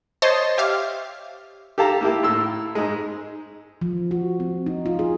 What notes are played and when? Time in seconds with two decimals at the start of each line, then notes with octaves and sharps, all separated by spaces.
0.22 C5 C#5 D#5 A5 C6
0.58 G4 E5 F5
1.78 G4 A4 F5 A5 A#5
2.01 A#3 E4 G4
2.23 A2 E6
2.75 G#2 G#3
3.81 F3
4.11 F#4
4.40 C4
4.66 D#4
4.86 F4
4.99 G#4